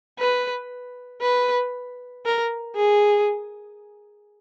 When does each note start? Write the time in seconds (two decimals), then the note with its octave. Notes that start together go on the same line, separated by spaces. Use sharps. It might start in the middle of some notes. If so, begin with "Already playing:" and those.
0.19 B4
1.21 B4
2.25 A#4
2.76 G#4